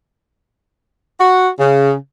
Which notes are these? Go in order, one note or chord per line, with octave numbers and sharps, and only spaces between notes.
F#4
C#3